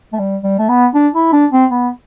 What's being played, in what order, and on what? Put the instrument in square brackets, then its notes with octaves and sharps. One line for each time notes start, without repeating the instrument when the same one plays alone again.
[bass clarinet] A3
G3
G3
A3
B3
D4
E4
D4
C4
B3